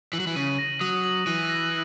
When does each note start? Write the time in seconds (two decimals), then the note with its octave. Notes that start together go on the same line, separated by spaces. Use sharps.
0.13 E3 F#7
0.20 F#3
0.27 E3
0.35 C#3 D#7
0.59 A#6
0.80 F#3 D#6
1.04 F#7
1.26 E3 D#7
1.49 A#6